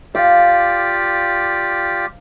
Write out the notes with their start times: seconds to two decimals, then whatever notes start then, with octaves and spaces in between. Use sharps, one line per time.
0.15 F4 G4 D5 F5